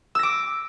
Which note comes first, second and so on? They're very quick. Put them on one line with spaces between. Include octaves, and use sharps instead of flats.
E6 A#6 D6